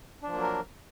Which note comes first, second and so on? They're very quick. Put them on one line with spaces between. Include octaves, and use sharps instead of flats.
D4 F3 A#3 F#3 A#4